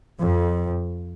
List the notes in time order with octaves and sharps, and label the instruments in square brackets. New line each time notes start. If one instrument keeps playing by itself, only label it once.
[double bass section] F2